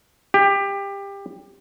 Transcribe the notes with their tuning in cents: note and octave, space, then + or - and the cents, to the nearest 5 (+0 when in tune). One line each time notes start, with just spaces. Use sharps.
G4 +20